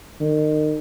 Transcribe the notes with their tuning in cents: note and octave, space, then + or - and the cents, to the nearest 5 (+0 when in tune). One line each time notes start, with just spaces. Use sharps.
D#3 -30